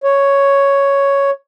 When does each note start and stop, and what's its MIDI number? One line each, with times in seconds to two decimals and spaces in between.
0.04 1.30 73